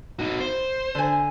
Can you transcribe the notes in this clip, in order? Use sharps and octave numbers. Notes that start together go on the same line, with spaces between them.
D#4 F#4
C5
D3 G#5